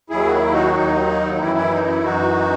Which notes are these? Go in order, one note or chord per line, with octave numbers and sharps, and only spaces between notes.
D#2 D#3 F#3 E4 G#4
F#4
E4
D#4 F#4
D#2 D#3 F#3 D#4
D#4
F#2 E3 E4
E4
D#4
E4
F#2 E3 D#4 F#4